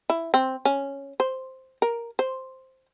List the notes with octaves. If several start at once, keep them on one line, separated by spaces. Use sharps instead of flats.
E4
C4
C#4
C5
A#4
C5